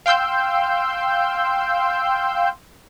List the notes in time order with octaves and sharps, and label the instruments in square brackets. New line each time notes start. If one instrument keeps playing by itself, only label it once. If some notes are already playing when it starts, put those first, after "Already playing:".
[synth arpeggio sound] F5 G5 C6 E6 G6